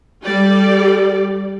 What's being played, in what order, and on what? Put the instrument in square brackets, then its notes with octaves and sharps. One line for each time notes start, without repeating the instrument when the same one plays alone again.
[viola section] G3 G4 A4 D5